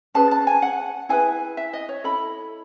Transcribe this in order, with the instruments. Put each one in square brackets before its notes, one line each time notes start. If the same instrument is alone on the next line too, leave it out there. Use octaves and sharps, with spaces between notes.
[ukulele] C#4 G#4 B4 A5
A5
G#5
F#5
E4 G#4 B4 G#5
E5
D#5
C#5
E4 A4 B5